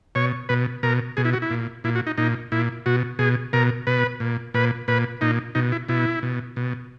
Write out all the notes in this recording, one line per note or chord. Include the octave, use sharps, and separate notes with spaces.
B2 C#5
B2 B4
B2 A#4
B2 G#4
E4
F#4
E4
A#2
A#2 E4
F#4
D#4
A#2 D#4
A#2 E4
B2 F#4
B2 G#4
B2 A#4
B2 B4
A#2
A#2 B4
A#2 B4
A#2 D#4
B2 D#4
E4
B2 E4
B2
B2